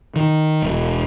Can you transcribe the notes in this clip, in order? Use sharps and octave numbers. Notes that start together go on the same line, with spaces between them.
D#3
E1